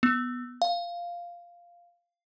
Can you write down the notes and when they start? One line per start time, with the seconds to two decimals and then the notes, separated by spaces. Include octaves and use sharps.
0.03 B3
0.62 F5